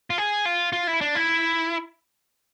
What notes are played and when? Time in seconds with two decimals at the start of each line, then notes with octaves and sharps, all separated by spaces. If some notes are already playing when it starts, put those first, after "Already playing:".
0.10 F4
0.18 G#4
0.45 F4
0.73 F4
0.87 E4
1.01 D4
1.15 E4